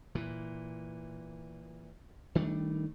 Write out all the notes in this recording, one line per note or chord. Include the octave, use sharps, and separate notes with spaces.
A#2 E3
D#3 G3 A3 D4